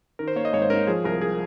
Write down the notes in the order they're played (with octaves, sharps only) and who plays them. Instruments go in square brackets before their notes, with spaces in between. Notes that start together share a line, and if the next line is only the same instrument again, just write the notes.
[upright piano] D#3 [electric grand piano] A#4
[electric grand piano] C5
[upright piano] A#3 [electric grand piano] C#5
[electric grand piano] D#5
[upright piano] G#1 [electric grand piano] C#5
[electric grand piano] C5
[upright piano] G#2 [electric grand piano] A#4
[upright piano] F3 [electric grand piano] G#4
[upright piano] C2 [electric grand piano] A#4
[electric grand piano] G#4